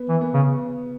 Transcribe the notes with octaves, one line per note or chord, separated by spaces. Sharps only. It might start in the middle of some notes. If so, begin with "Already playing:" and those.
Already playing: B3
E3
B3
C#3